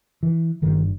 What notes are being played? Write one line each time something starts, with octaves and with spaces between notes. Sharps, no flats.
E3
G1 G2 D#3